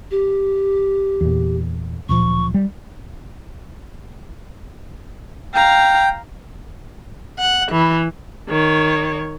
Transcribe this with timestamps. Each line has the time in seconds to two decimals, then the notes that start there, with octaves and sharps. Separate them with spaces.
0.11 G4
1.21 E2 A#2
2.09 D1 A#2 F3 C#6
2.54 G3
5.54 F5 G5 A#5
7.39 F#5
7.72 E3
8.49 D#3 C#5